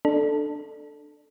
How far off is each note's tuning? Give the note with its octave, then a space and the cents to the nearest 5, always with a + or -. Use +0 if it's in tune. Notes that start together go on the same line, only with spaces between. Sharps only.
D4 +15 A4 +0